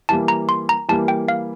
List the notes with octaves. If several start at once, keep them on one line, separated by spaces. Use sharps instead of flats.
E3 G3 A#3 A5
A#5
C6
A#5
E3 G3 A#3 A5
G5
F5